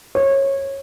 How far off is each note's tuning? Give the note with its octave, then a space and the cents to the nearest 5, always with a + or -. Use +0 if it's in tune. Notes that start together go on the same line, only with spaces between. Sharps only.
C#5 -20